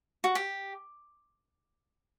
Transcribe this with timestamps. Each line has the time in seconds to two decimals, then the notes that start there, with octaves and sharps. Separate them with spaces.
0.24 F#4
0.35 G4